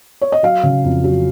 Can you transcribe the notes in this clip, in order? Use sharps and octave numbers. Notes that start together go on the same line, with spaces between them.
C#5
D#5
F#3 F5
C#3
F2
F#3